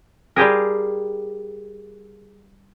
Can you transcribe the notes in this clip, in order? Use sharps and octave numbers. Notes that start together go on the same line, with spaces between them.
G3 F4 G4 G#4 A#4